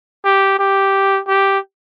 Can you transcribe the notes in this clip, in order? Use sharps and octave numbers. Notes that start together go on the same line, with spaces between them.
G4
G4
G4